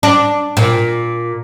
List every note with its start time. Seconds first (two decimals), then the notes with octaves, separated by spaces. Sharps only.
0.03 D4
0.57 A#2